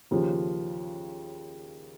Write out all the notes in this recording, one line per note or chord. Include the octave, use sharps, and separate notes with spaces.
D#2 C#3 F3